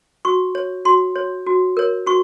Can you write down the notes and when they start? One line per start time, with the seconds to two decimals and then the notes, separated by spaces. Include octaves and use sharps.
0.25 F#4 C#6
0.55 C#5
0.85 F#4 C6
1.16 C#5
1.46 F#4
1.77 A#4 C#5
2.06 F#4 C#6